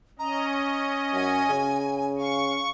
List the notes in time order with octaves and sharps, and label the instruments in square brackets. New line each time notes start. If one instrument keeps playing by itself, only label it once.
[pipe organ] C#4 D#5 [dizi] A#5
[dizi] C#6
[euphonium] F#2 [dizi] G#5
[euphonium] C#3
[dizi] F5 [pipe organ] C#6